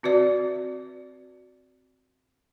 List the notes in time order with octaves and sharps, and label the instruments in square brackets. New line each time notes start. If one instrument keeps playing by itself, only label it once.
[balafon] C4 F#4 B4 D5 E5